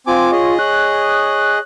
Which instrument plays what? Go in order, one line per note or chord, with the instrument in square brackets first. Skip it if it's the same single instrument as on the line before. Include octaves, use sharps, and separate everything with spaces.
[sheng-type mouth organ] C4 G#5 D6 [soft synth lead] F4
[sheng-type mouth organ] G#4 D#5 [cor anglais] C#5
[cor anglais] C#5 [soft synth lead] F#6